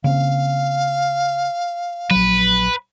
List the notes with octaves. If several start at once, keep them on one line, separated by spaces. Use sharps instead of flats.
C#3 A#3 C4 F5
A#1 F#3 B4